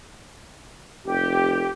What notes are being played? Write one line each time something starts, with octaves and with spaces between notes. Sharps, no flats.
F1 G4